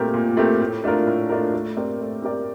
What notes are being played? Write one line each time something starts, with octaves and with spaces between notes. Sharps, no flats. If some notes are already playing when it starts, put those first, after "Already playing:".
Already playing: A#2 A3 C4 G4 A#4
A#2
A3 C4 G4 A#4
A2
A3 D4 F4 A#4
A2
A3 D4 F4 A#4
A3
C4 G4 A#4 D5
A3
C4 G4 A#4 D5